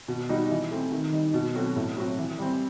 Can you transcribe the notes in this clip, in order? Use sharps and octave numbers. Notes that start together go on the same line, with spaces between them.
B2
G3 D#4 F#4
E3
A3 C4
D#3
G3 D#4
B2
F#3 C4 F#4 A4
A2
F#3 C4 F#4
E3
G3 C4